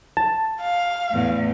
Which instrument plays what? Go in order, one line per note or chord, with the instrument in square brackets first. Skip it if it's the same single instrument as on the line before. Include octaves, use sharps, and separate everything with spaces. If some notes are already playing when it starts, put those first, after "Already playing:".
[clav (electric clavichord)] A5
[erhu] F5
[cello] E2 A2